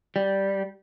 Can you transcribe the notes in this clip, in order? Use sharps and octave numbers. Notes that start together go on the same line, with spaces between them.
G3